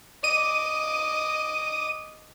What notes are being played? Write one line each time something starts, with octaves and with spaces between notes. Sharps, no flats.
D#5 D6 D#7